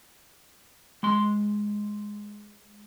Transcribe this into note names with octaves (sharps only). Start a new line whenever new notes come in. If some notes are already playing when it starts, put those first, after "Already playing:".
G#3 C6